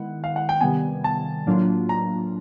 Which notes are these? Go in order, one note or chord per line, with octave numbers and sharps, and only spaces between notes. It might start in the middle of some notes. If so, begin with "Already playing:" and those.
Already playing: D#3 G#3 B3 E4 F#5
F5
F#5
G5
C3 D#3 G3 B3 G#5
A5
A2 F#3 A#3 D4 F4
A#5